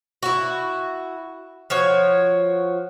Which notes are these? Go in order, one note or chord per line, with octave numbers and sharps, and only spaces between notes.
E4 F#4
F3 F#4 C#5